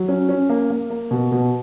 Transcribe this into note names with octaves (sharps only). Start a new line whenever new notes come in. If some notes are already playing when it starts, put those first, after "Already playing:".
Already playing: F#3
C#4
C#4
A#3
A#3
A#3
B2
B2